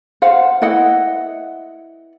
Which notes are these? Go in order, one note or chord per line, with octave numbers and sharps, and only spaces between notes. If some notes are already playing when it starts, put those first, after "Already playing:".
C5 F5 F#5
E4 B4 D#5 F#5